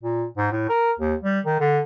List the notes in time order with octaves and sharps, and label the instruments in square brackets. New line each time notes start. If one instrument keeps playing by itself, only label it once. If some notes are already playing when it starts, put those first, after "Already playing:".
[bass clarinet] A#2
G#2
A2
A#4
D#2
G3
D#3
D3